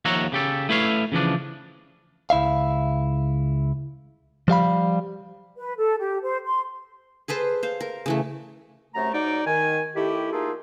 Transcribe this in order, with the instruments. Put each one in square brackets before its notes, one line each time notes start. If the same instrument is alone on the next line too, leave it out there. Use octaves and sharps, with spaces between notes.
[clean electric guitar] D#2 F3 C#5 E5 F#5 A#5
C#3 G4 A4
A3 E4 B4 C#5 F5
C#3 E3 F3 D4
C#2 E4 E5 F5
F3 G3 F5 B5
[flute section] B4
A4
G4
C5
C6
[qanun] G#4 A4 B4 C5
C5 F5
A#4
C#3 E3 A3
[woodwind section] F#2 C3 A3 A#5
G#2 F#3 D#4 D5
D#3 G#5
D#3 A3 E4 G4
A3 A#3 D#4 F4 G#4